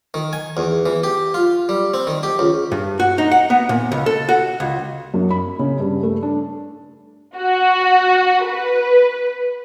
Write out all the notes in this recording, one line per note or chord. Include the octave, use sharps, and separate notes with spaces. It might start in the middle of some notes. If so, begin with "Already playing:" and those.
D#3
G#5
E2
E3
G4
F4
G3
C4
D#3
G4
C#2
G2
F#4
D#4
F#5
B3
A#2
C#2
A4
F#4
C#2
F#2
B5
C#3
G2
A3
D4
F#4
B4